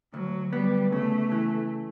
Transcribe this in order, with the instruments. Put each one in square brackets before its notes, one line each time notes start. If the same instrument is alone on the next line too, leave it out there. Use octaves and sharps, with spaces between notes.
[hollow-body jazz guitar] D2 [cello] F#3
[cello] G3 [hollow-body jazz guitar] B3
[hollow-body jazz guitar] C#3 [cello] A3
[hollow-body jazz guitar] E3